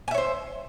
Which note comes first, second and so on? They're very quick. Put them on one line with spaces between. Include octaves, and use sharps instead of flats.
G#5 E5 C#5 C5